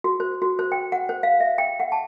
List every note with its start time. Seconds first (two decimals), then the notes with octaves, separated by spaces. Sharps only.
0.04 F#4
0.20 C5
0.42 F#4
0.59 C5
0.72 G5
0.92 F#5
1.09 C5
1.23 F5
1.40 E5
1.58 G5
1.80 F#5
1.92 A5